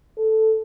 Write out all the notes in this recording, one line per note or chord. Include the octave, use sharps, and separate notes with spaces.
A4